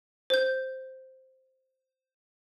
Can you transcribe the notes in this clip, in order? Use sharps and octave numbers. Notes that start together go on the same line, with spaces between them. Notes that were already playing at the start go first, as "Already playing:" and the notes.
C5 G6